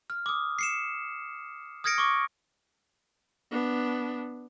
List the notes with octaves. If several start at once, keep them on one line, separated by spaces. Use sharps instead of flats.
F6
D6 D#6
C7 C#7 E7
D#6 F6 G#6 A#6 C#7 D7
C#6 D6
B3 D4